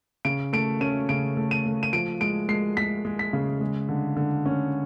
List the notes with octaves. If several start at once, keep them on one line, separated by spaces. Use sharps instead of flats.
C#3 D7
A3 D7
C#4 D#7
C#3 D7
A3
D#7
A3
D#7
F3 D7
G#3 D7
G#3 C7
G#3 B6
G#3
B6
C#3
G#3
D3
D3
C#4